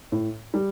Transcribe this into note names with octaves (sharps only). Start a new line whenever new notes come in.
A2
G3